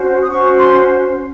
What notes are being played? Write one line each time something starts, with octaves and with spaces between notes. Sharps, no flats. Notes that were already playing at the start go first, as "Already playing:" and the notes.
Already playing: C#4 F#4 C5
D#6
C#4 F#4 C5 C#6
C6